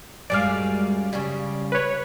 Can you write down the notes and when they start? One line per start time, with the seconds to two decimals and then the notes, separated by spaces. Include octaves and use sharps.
0.30 F#2 G3 G#3 D5 F5
1.13 C#3 G3
1.72 B4 C#5